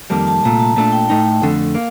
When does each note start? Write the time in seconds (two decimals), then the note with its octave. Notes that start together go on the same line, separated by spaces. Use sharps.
0.10 F2 D#3 G3 A#3 A5
0.27 A5
0.43 C2 A#2 A3 A#5
0.59 A5
0.76 A#2 A3 D4 A5
0.92 G5
1.09 A2 A3 D#4 G5
1.42 F2 D3 A3
1.75 A#3 F5